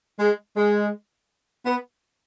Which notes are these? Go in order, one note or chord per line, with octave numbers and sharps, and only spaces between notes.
G#3
G#3
B3